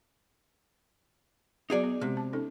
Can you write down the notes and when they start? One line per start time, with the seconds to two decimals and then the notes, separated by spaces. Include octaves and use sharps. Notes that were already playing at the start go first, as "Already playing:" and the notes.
1.70 F#3 B3 D#4 F#4 G#4 D5
1.83 B3
2.01 C3 G#3 G4
2.17 A5
2.33 C#4 D#4 A4